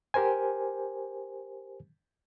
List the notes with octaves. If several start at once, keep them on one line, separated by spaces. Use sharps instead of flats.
G4 A#4 C5 G#5